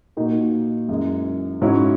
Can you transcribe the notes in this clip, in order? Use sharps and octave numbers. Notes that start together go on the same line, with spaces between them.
A#2 A#3 D#4 F#4
F#2 E3 G#3
G#2 F#3 C#4 E4